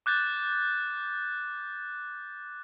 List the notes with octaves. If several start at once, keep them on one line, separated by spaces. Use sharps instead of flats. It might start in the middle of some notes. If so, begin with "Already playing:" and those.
D6 F#6 G6 A6